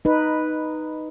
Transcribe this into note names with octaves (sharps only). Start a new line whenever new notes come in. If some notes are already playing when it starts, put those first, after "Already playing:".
D#4 B4